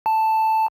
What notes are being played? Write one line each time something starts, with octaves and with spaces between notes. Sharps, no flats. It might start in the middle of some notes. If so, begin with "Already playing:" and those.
A5